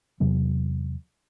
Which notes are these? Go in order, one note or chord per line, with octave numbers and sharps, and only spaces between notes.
E2 C3 F#3 B3